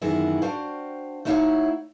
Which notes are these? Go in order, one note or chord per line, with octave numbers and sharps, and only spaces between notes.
F#2 D#3 E3 G#3 B3 E4
D4 F#4 C5 F5 G5
A3 D#4 E4 F#4 C#5 F5